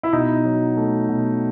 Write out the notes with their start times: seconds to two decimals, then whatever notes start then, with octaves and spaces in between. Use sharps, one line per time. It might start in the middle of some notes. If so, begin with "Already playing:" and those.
0.03 E4
0.13 B2 D#4
0.44 F#3
0.77 A3
1.08 B2